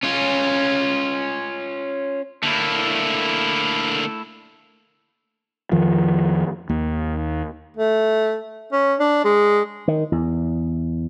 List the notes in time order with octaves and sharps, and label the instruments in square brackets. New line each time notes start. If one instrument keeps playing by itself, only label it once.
[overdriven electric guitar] C#4 F4
[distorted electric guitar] D3 A#3 [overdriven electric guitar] A3 E4
[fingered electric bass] F2 D#3 F3
D#2
[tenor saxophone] A3
C#4
D4
G#3
[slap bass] D#3
E2